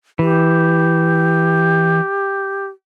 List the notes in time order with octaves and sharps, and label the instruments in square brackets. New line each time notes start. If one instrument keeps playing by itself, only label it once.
[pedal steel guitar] E3 [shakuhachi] G4